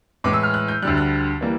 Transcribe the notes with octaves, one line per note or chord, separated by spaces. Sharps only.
A2 E3 G#3 D6
E6
F6
F#6
G6
D2 D3 G3 F#6
F#6
E3 G3 A#3